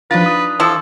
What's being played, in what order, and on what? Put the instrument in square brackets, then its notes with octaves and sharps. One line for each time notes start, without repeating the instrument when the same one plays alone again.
[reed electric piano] F3 A6 [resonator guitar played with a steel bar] D4 D#4 F4 [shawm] B4
[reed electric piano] D#6
[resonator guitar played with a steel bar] E3 E4 [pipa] F3 [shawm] A4